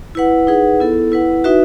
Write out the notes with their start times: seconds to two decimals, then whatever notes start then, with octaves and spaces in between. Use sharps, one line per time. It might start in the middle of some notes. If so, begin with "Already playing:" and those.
0.15 E4 B4 F#5
0.47 D#4 G#4 B4 F#5
0.80 B3 E4 A4
1.12 E4 B4 F#5
1.44 D#4 F#4 B4 E5